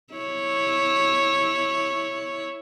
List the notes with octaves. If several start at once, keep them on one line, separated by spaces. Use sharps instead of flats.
E4 C#5